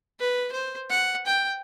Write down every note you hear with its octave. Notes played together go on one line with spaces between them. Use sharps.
B4
C5
F#5
G5